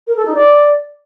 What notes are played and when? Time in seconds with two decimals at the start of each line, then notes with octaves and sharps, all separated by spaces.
0.07 A#4
0.16 A4
0.25 D#4
0.34 D5